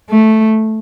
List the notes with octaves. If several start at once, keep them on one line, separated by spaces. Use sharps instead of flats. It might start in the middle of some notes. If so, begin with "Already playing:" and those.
A3